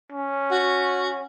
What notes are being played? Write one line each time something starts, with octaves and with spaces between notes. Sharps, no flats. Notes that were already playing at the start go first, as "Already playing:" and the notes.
C#4
F#4